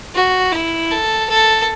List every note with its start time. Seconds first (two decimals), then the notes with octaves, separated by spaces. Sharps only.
0.15 F#4
0.52 E4
0.91 A4
1.29 A4